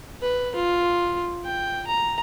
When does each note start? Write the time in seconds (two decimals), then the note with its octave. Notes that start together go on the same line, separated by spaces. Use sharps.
0.22 B4
0.55 F4
1.45 G5
1.87 A#5